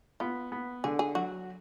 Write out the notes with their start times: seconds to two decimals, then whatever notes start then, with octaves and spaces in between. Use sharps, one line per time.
0.20 B3 F4
0.52 B3
0.84 D3 G#4
0.99 G#4
1.15 F#3 F#4